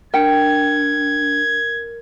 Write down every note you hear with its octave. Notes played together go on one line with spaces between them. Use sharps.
D4 A#4 G5 G#6 C#7